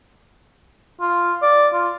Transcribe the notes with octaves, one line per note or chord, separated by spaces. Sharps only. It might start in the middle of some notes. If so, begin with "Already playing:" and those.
F4
D5
F4